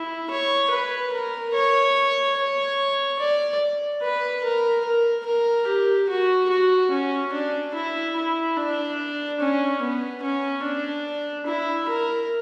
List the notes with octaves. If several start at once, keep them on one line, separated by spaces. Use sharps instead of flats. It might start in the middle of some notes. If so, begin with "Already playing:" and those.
Already playing: E4
C#5
B4
A#4
C#5
C#5
D5
B4
A#4
A#4
A#4
G4
F#4
F#4
C#4
D4
E4
E4
D4
C#4
B3
C#4
D4
E4
A#4